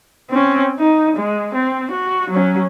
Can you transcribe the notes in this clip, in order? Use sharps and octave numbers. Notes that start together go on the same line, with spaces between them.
C4 C#4
D#4
G#3
C4
F#4
F#3 C#4